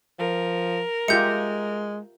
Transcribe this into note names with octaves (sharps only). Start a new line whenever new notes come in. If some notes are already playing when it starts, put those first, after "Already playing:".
F3 A#4
G#3 F4 G4 E5 G6 C#7